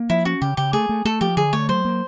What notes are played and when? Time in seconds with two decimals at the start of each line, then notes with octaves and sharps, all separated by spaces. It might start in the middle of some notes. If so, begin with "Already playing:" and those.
Already playing: A#3
0.10 F3 E4
0.25 C#4 F#4
0.42 C#3 G4
0.57 C#3 G4
0.73 A3 G#4
0.89 A3
1.05 A3 A4
1.21 F3 G4
1.37 D3 G#4
1.53 A3 C#5
1.69 F#3 C5
1.85 A#3